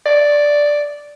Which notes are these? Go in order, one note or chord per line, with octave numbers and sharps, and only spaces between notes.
D5